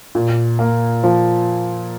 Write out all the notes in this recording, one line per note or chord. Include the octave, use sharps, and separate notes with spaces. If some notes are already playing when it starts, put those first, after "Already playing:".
A#2
A#3
F3